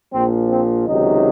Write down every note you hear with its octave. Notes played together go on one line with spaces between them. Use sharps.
A#1 A#2 F3 C4
C4
C#2 C3 D#3 F#3 D#4